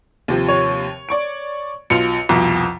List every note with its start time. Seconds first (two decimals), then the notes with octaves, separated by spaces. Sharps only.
0.28 D#2 C3 F3
0.48 C#5
1.09 D5 C#6 D7
1.90 B1 F4 C#7 F7
2.29 C2 F2 B2